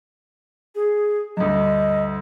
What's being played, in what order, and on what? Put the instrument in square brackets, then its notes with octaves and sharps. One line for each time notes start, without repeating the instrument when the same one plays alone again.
[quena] G#4
[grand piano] D2 G2 [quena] D#5